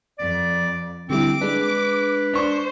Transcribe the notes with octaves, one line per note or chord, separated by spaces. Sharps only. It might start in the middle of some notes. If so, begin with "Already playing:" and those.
F2 D5
D3 G3 C4 E4 D6
G#3 D4 B4
D4 C5 C#6